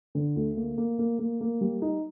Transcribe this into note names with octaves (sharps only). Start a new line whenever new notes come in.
D3
D2
A#3
A#3
A#3
A#3
A#3
G3
D#4